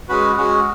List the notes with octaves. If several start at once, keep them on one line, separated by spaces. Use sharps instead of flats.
G#3 C#4 F#4 B4
G#3 C#4 F#4